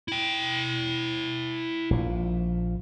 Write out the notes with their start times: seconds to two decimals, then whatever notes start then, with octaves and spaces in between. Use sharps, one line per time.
0.08 E4 G5
1.90 A#1 F3